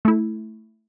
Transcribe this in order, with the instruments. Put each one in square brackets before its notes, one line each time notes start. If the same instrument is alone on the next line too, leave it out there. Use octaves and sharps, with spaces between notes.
[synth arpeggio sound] A3 E4